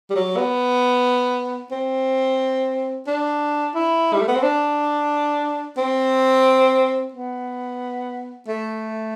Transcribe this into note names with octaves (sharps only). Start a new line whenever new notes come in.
G3
F#3
B3
C4
D4
E4
G3
A3
B3
C4
D4
C4
B3
A3